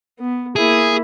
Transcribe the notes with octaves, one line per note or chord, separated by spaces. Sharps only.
B3
A#3 E4 G#4